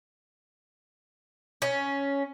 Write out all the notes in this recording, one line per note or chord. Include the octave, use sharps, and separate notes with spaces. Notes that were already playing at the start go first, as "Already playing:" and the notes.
C#4